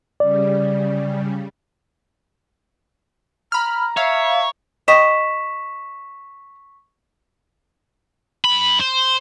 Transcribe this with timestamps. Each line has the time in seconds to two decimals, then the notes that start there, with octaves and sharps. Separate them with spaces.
0.20 C#3 G3 D5
3.52 A#5 B5 F6
3.97 C#5 E5 F5
4.88 G4 D#5 C#6 B6 E7
8.44 G2 B5
8.80 C5